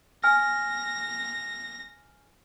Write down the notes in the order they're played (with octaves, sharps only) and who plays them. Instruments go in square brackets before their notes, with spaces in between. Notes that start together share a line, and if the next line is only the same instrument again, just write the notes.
[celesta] G#5 F6 [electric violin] A#6